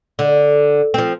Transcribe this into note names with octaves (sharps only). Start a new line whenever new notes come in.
D3
F3 C4